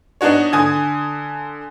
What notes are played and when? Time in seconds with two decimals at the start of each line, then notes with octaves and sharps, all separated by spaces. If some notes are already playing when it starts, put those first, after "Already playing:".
0.21 B3 D4 D#4 F#4 C#5
0.53 D3 G#5 D#6 G#6